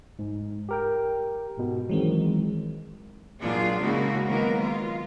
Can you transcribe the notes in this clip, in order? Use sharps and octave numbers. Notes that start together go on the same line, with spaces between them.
G#2
G4 A#4 G5
G#2 B2
D#3 E3 F#3 G#3 C4
A#2 F#3 G#3 D4 F4 G#4
C#3 G#3 A#3 E4 F#4
D#3 F#3 G#3 A#3 B3 A#4
F4